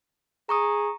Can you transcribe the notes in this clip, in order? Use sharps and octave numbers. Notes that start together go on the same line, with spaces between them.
G#4 A#5 C#6 D#6